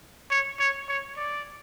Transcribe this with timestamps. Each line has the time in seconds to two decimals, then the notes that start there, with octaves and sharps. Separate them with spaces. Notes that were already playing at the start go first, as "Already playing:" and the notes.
0.31 C#5
0.60 C#5
0.89 C#5
1.17 D5